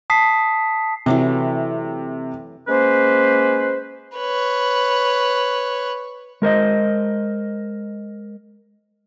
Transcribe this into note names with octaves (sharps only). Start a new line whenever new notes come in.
A5 D#6 B6 C7
C3 E3 F#3 A3
G#3 A#3 C#4 B4 C5
B4 C#5
G#3 A#4 C5 D#5